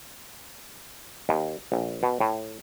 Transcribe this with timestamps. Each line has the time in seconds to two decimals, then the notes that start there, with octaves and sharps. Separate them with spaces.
1.29 D#2
1.72 A#1
2.03 B2
2.20 A2